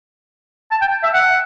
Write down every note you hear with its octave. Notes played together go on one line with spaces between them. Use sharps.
A5
G5
E5
F#5